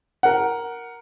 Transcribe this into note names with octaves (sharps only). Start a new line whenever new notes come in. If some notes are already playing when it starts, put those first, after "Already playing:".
A#4 F#5